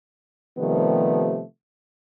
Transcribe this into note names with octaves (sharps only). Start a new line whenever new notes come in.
C3 D#3 F3 G3 A3 B3